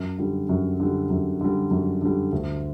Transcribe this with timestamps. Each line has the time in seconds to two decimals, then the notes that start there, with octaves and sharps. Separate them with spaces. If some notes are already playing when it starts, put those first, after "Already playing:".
Already playing: F#2
0.18 D3 G3
0.49 F#2
0.80 D3 G3
1.10 F#2
1.41 D3 G3
1.71 F#2
2.02 D3 G3
2.32 D2